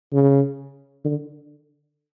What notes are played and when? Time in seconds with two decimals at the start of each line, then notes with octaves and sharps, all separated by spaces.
0.13 C#3
1.05 D3